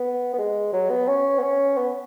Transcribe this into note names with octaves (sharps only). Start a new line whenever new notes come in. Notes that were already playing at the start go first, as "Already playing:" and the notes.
Already playing: B3
B3
G#3
F#3
B3
C#4
B3
C#4
B3